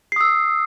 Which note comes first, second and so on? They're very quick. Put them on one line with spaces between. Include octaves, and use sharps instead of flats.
C7 D#6 E6